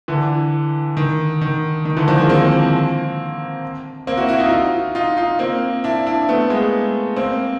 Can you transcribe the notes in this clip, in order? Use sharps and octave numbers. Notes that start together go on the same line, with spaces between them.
D3 E3
D#3
D#3
D#3
D3 E3
D#3 F3
G#3 A#3
A#3 C4
A#3 C4
E4 F#4
E4 F#4
D#4 F4
D#4 F4
D#4 F4
D#4 F4
A#3 C4
D4 E4
D4 E4
A3 B3
G#3 A#3
A#3 C4